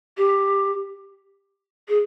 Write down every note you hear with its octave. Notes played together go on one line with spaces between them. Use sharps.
G4
G#4